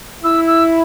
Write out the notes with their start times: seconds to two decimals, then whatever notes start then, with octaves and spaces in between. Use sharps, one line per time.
0.24 E4 E6
0.47 E6